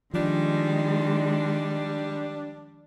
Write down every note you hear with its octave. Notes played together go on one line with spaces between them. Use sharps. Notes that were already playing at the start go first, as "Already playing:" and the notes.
D#3 F3 G3 G#3 D4